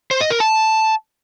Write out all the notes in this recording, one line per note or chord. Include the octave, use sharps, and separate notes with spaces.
C5
D#5
A#4
A5